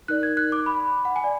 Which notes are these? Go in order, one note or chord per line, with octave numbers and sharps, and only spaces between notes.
D#4 A#4 D5 F#6
G#6
F#6
D6
B5
F#5
G#5
D5